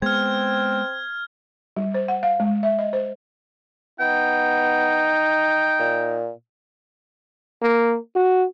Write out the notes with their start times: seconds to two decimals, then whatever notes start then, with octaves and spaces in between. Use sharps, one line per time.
0.02 G#3 B3 C4 F6 G#6
1.77 G3
1.94 C5
2.08 F#5
2.23 F5
2.40 G#3
2.63 E5
2.79 D#5
2.93 C5
4.00 B3 D#4 G5
5.80 A#2
7.62 A#3
8.15 F#4